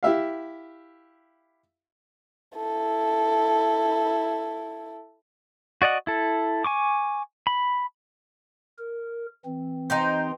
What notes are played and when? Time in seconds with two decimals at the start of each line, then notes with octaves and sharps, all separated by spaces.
0.03 E4 G4 E5 F5
2.56 E4 A4
5.82 F#4 D5 D#5 F#5
6.07 E4 A4
6.64 G#5 C#6 D6
7.47 B5
8.78 A#4
9.45 E3 C4
9.90 D#4 G4 C5